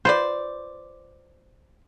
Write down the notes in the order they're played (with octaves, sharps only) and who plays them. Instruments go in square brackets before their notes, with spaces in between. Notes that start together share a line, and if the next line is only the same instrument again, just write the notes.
[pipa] F4 B4 D5 [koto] C5